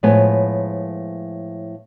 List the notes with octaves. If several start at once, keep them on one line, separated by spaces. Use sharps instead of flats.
A2 F3 G#3 B3 C#5 G#5